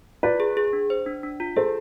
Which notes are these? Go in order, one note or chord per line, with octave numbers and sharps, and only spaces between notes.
F4 B4 D5
G#4
G#4
D4
C5
D4
D4
F4
G#4 A4 C5